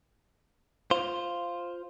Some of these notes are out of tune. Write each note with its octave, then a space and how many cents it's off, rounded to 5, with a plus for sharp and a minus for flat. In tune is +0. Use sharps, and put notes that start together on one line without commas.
F4 +0 C5 +0